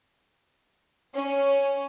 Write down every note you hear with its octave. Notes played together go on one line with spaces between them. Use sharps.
C#4